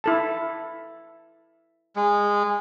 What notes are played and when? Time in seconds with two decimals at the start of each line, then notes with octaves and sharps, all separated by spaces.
0.04 E4 A4 A5
1.96 G#3